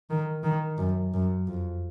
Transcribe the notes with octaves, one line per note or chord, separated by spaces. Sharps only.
D#3
D#3
F#2
F#2
F2